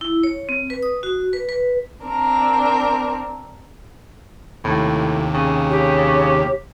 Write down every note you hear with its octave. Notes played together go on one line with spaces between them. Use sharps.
E4
C#5
C4
B4
D#6
F#4
B4
B4
C4 D4 A#4
D#2 A2 C3
C#3
G4 C#5